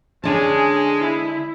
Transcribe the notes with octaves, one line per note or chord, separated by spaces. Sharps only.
D3 G#3 C#4 D4 G#4 A5
E4